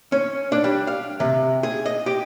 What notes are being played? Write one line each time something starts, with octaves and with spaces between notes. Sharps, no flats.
C#4
D4
G3
F5
C3
G#4
D#5
G4